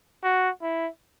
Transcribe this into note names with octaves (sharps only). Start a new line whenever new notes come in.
F#4
E4